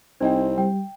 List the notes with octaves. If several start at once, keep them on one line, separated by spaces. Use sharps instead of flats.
C2 C4 D#4 D#5 G5
G3 G5